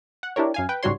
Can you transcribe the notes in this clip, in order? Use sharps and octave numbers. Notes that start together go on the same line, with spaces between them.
F#5
D4 E4 G4 A#4 C#5
F#2 F5 G#5
B4 G5
C#2 G#2 G3 F#4 C#5 C6